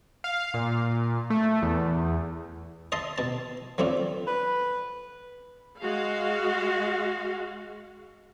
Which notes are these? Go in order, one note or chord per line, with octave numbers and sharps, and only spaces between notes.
F5
A#2
A3
E2
D#5 E5 A5 C6
B2 A5
F#3 A3 C4 D4 F4
B4
G#3 F#4 F5